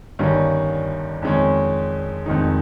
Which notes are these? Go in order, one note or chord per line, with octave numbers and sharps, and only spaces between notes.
G1 G2 D#3 G3 C#4
F2 D#3 G#3 C#4
F1 F2 D#3 G#3 D#4